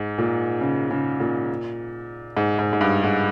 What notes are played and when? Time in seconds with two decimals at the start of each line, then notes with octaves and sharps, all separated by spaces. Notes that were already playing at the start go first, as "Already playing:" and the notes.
Already playing: G#2
0.18 A#2
0.61 C#3
0.90 C#3
1.20 A#2
2.37 G#2
2.59 G#2
2.73 G#2
2.81 G2
3.03 G#2